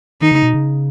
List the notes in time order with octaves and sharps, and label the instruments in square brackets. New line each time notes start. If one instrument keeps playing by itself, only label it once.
[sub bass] D#3 [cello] D#4
[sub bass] C#3
B2
C#3